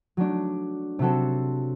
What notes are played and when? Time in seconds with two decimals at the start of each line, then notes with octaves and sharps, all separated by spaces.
0.17 F#3 A3 D4
0.99 C3 F#3 C4 F#4 A4